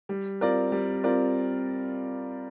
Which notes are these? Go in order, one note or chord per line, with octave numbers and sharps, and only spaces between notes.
G3
C4 F4 A#4 D5
G3
C4 F4 A#4 D5